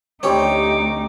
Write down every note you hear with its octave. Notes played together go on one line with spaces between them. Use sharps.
D2 G3 C4 C#4 D#4 G4 C#5 D6